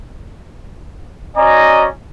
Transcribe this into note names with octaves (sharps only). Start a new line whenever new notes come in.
C#4 F#4 D5 D#5 G#5 A#5